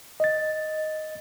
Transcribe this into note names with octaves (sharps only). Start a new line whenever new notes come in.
D#5 A6